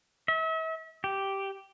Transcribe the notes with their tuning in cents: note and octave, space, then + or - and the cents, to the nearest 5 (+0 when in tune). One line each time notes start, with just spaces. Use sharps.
E5 -40
G4 -5